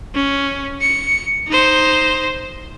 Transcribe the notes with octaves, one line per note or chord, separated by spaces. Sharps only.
C#4
C#7
D#4 C5